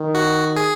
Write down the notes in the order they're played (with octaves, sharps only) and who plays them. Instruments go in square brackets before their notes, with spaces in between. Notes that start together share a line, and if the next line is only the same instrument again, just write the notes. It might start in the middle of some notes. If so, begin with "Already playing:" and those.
Already playing: [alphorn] D#3
[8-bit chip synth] F#4
G#4